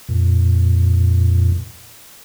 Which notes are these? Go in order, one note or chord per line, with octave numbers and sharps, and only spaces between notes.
F2 A#2